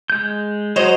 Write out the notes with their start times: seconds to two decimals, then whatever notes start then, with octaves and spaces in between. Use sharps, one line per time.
0.10 G#3 G6
0.76 F#3 C5 C#5 D#5